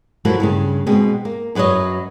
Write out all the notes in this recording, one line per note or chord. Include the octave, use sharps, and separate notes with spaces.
F3 F#3 A3 A#3 E4 F#4
G2 A#2 C#3
B2 G#3 C4
A#3
F#2 F#3 B4 C#5 D#5